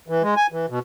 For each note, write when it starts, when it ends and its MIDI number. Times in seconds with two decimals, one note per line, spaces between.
0.08 0.23 52
0.23 0.35 56
0.36 0.47 80
0.52 0.66 52
0.69 0.79 47